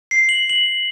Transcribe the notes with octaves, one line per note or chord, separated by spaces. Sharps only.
C7
F#7
F#7